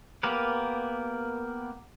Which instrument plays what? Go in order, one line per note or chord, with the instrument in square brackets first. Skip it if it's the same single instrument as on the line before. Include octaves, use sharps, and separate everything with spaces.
[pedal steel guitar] A#3 B3 G4 A#4 B4